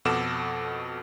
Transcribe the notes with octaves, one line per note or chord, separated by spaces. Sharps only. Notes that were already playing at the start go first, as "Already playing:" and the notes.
F2 B2 F#4 A4 D6 E7